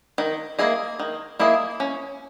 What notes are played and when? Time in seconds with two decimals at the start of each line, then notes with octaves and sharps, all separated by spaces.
0.18 D#3
0.59 A#3 E4 G#4 D#5
0.99 D#3
1.39 A#3 E4 G#4 D#5
1.80 C#4